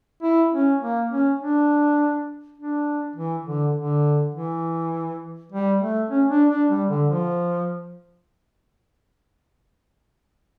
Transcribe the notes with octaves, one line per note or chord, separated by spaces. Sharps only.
E4
C#4
A#3
C#4
D4
D4
E3
D3
D3
E3
G3
A3
C#4
D4
D4
G3
D3
F3